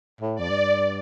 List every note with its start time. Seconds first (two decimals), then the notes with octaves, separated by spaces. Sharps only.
0.21 A2
0.35 F2 D5
0.49 G2